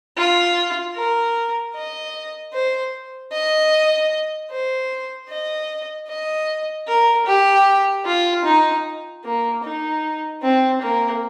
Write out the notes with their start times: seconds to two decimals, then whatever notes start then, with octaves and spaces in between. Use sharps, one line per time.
0.17 F4
0.96 A#4
1.75 D#5
2.54 C5
3.32 D#5
4.51 C5
5.29 D#5
6.08 D#5
6.88 A#4
7.27 G4
8.06 F4
8.45 D#4
9.25 A#3
9.64 D#4
10.43 C4
10.82 A#3